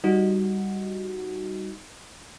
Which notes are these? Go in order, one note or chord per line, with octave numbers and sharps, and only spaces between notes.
G3 D#4 F#4